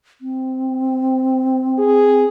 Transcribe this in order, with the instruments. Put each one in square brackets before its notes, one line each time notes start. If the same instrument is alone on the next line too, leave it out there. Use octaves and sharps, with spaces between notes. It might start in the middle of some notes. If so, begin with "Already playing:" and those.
[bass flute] C4
[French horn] G#4